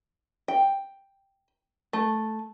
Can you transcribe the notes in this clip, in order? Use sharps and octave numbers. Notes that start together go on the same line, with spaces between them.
G5
A3